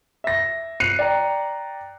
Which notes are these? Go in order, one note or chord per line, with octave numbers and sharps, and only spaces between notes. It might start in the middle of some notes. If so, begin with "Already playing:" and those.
E5 A#6
F#6 C7 C#7 D#7 F7
D5 G5 A#5